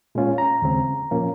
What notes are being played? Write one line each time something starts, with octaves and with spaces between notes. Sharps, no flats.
A#2 G#3 C#4 F4
A#5
D#2 C#3 G#3 C4
A#2 F3 A#3 C#4